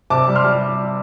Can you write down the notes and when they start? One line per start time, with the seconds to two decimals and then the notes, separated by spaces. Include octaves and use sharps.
0.10 C3 A5 D6
0.28 G3
0.36 C6 F6
0.44 G3